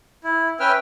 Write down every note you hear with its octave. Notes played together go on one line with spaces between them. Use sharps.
E4
C#4 B4 E5 G5 F6